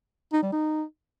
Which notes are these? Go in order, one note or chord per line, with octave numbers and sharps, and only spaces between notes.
D#4
G3
D#4